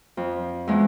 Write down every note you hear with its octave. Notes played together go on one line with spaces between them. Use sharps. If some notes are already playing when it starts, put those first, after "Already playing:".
F2
E2 G#3